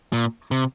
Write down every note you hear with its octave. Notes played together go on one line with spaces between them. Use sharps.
A#2
C3